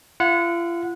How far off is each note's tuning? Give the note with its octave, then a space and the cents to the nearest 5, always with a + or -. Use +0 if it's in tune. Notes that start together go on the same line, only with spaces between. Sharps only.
F4 -40 F#5 -20